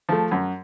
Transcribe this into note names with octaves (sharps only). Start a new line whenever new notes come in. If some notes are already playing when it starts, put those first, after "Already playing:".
F3 A3
F#2